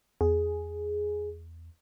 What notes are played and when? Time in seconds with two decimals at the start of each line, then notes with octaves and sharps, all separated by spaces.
0.21 E2 G#4